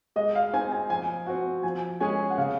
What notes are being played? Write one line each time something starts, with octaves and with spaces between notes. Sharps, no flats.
G#3 D#5
F5
C4 D#4 G#5
G#5
F3 G#5
C4 F#4
F3 G#5
G#3 C#4 G#4 G#5
F#5
C#3 F5